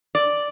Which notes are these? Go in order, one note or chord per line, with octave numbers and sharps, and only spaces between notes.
D5